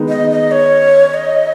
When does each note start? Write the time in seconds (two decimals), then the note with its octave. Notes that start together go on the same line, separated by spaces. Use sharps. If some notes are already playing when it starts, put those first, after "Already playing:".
Already playing: D#3 G#3 B3 D#4
0.09 D#5
0.30 D#5
0.51 C#5
1.14 D#5